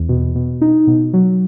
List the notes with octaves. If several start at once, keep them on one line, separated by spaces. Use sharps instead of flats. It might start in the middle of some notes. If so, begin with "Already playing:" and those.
Already playing: E2
B2
B2
D#4
B2
F#3